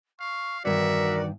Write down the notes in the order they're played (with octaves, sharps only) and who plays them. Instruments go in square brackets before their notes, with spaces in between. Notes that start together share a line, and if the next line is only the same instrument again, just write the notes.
[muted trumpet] F5 [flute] C#6
[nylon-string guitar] E2 G2 D#3 [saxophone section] F#4 D5 [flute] A#4 [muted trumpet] E5